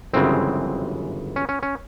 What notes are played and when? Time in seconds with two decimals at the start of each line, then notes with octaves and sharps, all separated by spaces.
0.13 G1 F#2 C#3 E3 G#3 C4
1.36 C#4
1.49 C#4
1.63 C#4